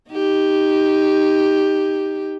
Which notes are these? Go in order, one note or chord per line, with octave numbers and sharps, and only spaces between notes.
D#4 G4